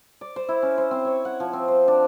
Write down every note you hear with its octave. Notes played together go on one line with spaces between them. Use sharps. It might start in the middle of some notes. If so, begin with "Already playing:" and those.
D5
C5
E4
C#4
C5
C4
C#5
F#5
F3
C4
C5
D4